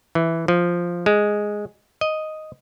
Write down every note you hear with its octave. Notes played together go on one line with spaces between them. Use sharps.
E3
F3
G#3
D#5